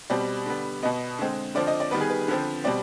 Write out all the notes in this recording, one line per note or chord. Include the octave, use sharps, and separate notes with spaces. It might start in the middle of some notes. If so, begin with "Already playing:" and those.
B2 G3 C4 D5
D3 G3 B3
B2 B3 D#5
D3 G#3 C4
D3 F3 C4 D5
D#5
D5
D#3 G3 B3 B4
G#4
B4
D3 F3 C4
B2 G3 C4 D5